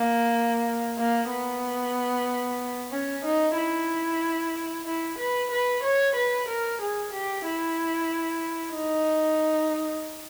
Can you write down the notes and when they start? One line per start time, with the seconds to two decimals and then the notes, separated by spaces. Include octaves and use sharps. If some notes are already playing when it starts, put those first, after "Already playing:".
Already playing: A#3
0.98 A#3
1.30 B3
2.92 C#4
3.25 D#4
3.57 E4
4.86 E4
5.18 B4
5.51 B4
5.83 C#5
6.15 B4
6.48 A#4
6.81 G#4
7.13 G4
7.45 E4
8.74 D#4